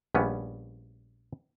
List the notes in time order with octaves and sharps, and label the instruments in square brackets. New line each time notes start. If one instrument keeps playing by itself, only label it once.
[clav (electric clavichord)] A#1 G3 B3 C#4